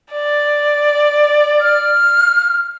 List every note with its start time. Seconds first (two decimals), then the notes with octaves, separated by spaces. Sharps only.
0.12 D5
1.61 F6